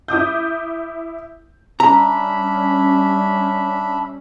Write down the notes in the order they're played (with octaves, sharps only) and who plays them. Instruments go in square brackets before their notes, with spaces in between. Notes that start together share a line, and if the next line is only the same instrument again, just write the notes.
[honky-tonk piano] E4 D6 D#6 G6
[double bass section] G3 C#4 [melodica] D4 E5 B5 [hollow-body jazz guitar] A#5